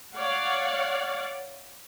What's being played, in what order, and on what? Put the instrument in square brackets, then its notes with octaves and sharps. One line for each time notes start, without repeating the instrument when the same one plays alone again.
[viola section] C#5 D5 F5 F#5